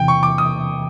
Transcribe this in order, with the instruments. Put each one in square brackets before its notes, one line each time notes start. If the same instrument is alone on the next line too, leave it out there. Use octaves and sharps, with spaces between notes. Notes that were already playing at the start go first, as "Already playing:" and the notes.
Already playing: [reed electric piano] E2 C3 E3 [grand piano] G5
[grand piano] C#6
D6
D#6